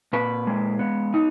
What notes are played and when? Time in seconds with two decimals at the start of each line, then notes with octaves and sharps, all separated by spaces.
0.13 A#2 B4
0.47 G#3
0.79 B3
1.14 D#4